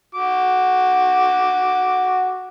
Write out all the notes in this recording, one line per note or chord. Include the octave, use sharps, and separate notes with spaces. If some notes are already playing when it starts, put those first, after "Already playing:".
F#4 D6